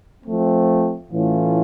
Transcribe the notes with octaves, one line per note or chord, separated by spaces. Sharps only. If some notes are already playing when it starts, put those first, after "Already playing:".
F3 A3 C4
A2 E3 A3 C#4 F4